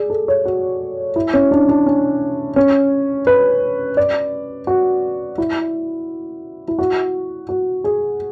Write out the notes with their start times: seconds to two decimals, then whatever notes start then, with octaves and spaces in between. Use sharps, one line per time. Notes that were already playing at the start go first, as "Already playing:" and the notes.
Already playing: G#4 D5
0.10 A4
0.28 C#5
0.45 F#4
1.16 E4
1.34 C#4
1.51 D4
1.69 D4
1.86 C#4
2.56 C#4
3.27 B4
3.97 D5
4.67 F#4
5.38 E4
6.68 E4
6.79 F#4
7.49 F#4
7.84 G#4